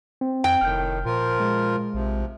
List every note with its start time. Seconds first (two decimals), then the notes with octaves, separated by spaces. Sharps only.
0.21 C4
0.44 F2 G5
0.61 F1 A2 D#3 F6 G6
1.05 A#2 F3 F4 A#4
1.40 G#3
1.94 A#1 C3 F3